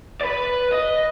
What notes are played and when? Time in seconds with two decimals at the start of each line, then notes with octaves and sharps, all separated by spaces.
0.22 D5
0.26 B4
0.73 D#5